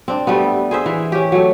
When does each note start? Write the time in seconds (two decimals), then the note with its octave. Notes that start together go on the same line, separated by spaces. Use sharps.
0.08 C4 D4
0.27 G3 A3 B3
0.71 G#4 C5 E5
0.86 E3
1.12 C#4 G4
1.32 F#3 A3